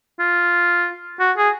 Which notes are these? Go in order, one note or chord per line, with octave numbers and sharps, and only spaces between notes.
F4
F#4
G#4